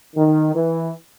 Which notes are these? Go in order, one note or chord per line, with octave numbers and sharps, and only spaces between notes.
D#3
E3